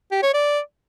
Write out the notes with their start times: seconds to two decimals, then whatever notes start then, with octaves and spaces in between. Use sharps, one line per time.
0.12 G4
0.23 C#5
0.34 D5